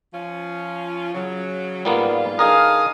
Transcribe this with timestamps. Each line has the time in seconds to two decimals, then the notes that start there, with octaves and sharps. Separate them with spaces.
0.13 F3 C#4 F4
1.14 C#3 F#3
1.85 G#2 G3 A#3 B3 F4
2.39 D3 C#4 D#4 G#4 A#4 F5 D#6